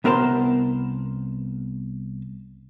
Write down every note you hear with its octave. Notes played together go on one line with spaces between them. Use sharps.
C2 B3 A#4 C5 A5 C6